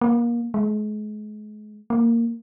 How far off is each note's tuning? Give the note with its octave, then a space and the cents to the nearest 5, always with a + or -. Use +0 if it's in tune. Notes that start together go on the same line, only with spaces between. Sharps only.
A#3 +25
G#3 +35
A#3 -10